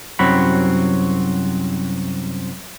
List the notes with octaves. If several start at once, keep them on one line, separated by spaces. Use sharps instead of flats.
C2 F#2 F#3 C4 F#4 B5